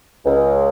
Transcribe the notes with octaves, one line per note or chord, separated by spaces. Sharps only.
C#2